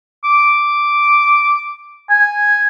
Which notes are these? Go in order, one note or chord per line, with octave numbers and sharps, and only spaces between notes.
D6
G#5